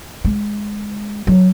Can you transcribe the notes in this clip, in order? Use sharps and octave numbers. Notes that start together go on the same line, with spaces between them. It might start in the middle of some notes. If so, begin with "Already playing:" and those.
G#3
F#3